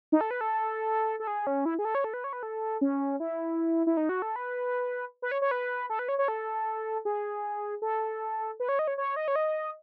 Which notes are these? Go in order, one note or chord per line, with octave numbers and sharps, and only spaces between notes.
D#4
A4
B4
A4
A4
G#4
C#4
E4
G#4
A4
C#5
A4
B4
C#5
B4
A4
C#4
E4
E4
D#4
F#4
A4
B4
B4
C#5
C#5
B4
A4
B4
C#5
C#5
A4
G#4
A4
B4
C#5
D#5
C#5
C#5
D#5
C#5
D#5